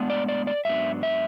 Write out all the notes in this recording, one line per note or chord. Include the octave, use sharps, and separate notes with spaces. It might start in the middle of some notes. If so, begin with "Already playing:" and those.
Already playing: A2 G#3 B3 D4
D5
D5
D5
G#2 F#3 B3 D4 E5
E5